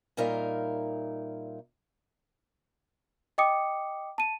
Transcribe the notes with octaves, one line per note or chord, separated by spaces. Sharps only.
A#2 G3 D#4 A#4 E5 F5
D#5 G5 D6 D#6 C#7
A5 D#7